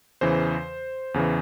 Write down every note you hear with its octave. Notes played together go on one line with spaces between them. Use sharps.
E2 C#3 E3 C5
E2 C#3 E3